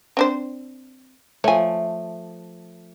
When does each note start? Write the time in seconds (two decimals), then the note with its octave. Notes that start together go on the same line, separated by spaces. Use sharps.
0.17 C4 D4 C5
1.44 F3 A3 C#5 G#5